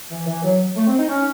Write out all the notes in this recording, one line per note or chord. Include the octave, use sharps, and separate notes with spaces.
E3
E3
F#3
A3
C4
D#4
C#4